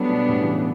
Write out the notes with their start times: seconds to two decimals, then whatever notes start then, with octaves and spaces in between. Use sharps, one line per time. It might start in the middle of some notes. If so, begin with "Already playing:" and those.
Already playing: F#3 G3 A3 B3 D4
0.10 B2
0.29 A2
0.41 C#3 E3